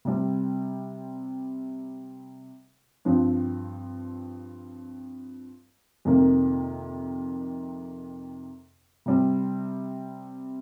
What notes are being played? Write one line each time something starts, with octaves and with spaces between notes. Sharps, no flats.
C3 G3 C4
G2 F3 C4
F2 C3 D#3 A#3
C3 G3 C4